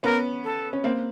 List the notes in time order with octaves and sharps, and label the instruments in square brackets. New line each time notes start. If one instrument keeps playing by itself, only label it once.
[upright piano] B3 C#4 [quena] A#4
[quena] A4
[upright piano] C#4
A#3 C4